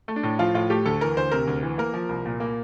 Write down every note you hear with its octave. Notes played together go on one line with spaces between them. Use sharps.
A3
D4
A2
F3 F4
A2 F4
A3 G4
D2 A4
E3 A#4
D2 C5
C3 A#4
D2
E3
A#3 A#4
F3
C2
A#2
A#3